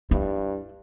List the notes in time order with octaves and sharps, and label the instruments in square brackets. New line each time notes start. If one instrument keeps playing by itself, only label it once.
[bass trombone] G2 [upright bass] E4